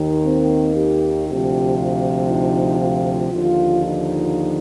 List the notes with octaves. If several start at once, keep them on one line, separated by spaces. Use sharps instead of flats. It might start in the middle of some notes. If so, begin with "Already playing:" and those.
Already playing: D#2 D#3
C4
G4
D2 C3 F3 G4
F4
D#4
F4
D#2 D3 F3 F4
D#4